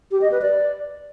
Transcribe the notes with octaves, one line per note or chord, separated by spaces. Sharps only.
G4
D#5
B4
D5